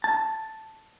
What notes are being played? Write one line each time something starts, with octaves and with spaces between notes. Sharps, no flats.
A5